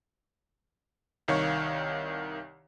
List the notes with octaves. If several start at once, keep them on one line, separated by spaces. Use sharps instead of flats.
C2 D#3 C#5 F5 C#6